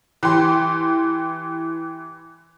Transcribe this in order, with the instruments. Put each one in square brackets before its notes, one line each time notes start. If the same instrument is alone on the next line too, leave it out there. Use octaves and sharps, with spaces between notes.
[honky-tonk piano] E3 G4 C6